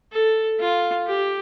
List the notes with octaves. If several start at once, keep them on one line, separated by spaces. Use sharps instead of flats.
A4
F4
G4